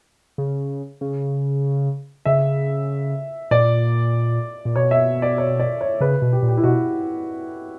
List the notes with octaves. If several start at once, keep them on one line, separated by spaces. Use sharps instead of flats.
C#3
C#3
C#3 E5
A#2 D5
A#2
B2 C#5
E5
D5
C#5
D5
C#5
C#3 B4
B2
G4
A#2
G4
E4
B2 F#4